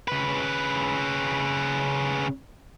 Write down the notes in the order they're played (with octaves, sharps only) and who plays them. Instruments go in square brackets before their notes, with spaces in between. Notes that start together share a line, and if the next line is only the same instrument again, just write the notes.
[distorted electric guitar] C#3 B4